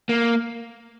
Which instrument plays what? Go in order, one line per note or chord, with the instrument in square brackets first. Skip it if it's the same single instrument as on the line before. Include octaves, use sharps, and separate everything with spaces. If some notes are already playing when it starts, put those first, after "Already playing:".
[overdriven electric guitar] A#3